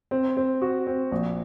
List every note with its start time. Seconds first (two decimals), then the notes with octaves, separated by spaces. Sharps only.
0.11 C4
0.37 C4
0.62 F#4
0.87 C4
1.12 A#1